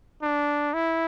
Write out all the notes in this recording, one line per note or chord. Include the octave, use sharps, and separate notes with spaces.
D4
E4